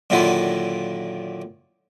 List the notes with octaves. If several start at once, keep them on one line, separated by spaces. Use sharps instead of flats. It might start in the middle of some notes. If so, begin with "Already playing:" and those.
F#2 A#2 D3 D#3 E4 F4